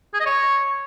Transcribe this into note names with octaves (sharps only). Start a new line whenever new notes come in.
G#4
D#5
C#5